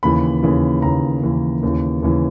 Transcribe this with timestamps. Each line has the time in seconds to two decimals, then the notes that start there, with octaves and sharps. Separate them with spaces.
0.03 D#2 C#3 E3 B5
0.43 D#2 C#3 E3
0.82 D#2 C#3 E3 A#5
1.23 D#2 C#3 E3
1.63 D#2 C#3 E3
2.03 D#2 C#3 E3